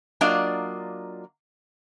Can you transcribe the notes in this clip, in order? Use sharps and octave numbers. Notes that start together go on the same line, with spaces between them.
F#3 A#3 D4 F4 D5 D#5